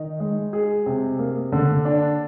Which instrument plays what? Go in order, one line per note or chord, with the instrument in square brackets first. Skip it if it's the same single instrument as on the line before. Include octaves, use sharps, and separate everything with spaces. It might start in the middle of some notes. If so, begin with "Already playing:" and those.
Already playing: [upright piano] D#3 D#4
G#3
G#4
C3
A#3
D3
D4